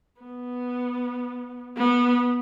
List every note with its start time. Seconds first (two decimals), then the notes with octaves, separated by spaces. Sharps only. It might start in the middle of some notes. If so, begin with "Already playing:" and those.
0.21 B3
1.77 B3